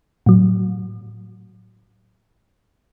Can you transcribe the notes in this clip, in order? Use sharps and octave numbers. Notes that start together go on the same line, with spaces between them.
A2 F#3